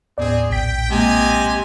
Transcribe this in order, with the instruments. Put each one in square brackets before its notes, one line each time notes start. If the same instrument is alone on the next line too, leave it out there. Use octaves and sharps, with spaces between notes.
[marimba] D#2 A2 B3 [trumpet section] C4 G#4 [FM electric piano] D5
[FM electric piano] A#1 B6 [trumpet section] G5
[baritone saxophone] C3 [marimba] G#3 A#3 [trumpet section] D#5 G#5